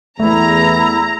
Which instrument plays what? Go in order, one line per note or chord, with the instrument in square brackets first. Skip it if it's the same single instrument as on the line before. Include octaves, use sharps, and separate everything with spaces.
[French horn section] E2 [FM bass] A3 [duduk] E4 [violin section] A#5